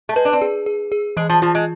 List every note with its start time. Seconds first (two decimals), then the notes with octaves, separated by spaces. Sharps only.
0.09 A3
0.16 G#3 B4
0.25 D4
0.33 C4
0.42 G#4
0.66 G#4
0.92 G#4
1.17 E3 G#3
1.29 F3
1.42 F3 F4
1.55 G#3